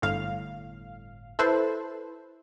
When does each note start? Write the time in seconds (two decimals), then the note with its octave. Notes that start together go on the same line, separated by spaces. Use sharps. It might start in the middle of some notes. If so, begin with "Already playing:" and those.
0.02 G1 A2 F5
1.39 E4 A4 B4 C5